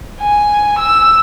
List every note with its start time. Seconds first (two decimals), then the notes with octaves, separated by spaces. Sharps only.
0.20 G#5
0.78 E6